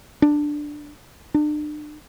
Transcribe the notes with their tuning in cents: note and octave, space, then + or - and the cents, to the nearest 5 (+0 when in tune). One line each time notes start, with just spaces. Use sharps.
D4 +10
D4 +40